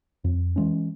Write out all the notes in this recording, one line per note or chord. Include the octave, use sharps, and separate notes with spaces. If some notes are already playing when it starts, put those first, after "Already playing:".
F2
E3 G#3 C#4